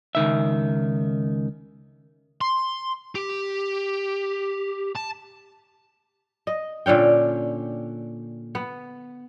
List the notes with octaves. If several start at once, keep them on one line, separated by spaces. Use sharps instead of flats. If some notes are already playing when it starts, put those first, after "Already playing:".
C#2 D#3 E5
C6
G4
A5
D#5
A#2 D3 C#4 G5
B3